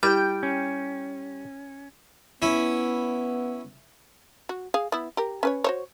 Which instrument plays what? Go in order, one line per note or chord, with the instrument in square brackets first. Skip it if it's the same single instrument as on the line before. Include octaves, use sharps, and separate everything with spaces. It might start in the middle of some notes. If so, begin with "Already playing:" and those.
[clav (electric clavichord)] G3 [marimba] E4 G4 [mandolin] G5
[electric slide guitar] C#4
[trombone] B3 [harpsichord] C#4 E4
[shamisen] F#4
G#4 F5
B3 E4
G4 A#4
C#4 B4 C#5
F#4 C5 C#5